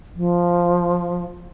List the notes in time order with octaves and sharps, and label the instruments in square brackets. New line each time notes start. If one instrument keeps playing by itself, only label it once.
[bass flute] F3